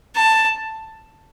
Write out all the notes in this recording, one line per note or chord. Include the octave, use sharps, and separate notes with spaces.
A5